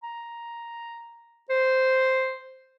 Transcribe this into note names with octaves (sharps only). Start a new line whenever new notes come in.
A#5
C5